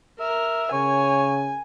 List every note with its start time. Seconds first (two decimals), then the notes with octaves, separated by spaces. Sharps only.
0.20 A#4 E5
0.72 C#3 C#5 G#5